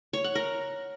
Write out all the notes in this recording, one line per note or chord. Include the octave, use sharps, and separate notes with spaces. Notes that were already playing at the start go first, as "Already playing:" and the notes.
C#5
F#5
A#4